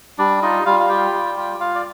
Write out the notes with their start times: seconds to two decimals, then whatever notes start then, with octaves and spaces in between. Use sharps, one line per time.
0.18 G3 D4 D5
0.42 D#4 F4 D#5
0.66 G3 F4 F5
0.80 F5
0.89 F4 G4 G5
1.13 G3
1.37 F4
1.60 F4 F5
1.75 D5